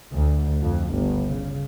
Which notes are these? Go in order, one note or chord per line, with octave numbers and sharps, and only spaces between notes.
D2
F2
G1
C#3